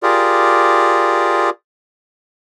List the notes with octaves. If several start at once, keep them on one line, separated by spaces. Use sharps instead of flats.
F4 G4 G#4 A#4 D5